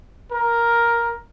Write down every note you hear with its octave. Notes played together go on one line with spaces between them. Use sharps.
A#4